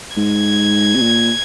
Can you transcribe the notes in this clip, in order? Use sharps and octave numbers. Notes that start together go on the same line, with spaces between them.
G#2 G#6
C3
A#2